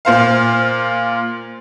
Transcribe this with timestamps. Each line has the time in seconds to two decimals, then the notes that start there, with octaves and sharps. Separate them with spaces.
0.05 A#2 C5 F5